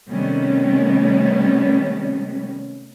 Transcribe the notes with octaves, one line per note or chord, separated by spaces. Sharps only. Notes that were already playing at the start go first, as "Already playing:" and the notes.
C3 D#3 G3 A3 B3 C#4